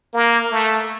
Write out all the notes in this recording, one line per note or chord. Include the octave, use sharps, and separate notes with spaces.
A#3
A3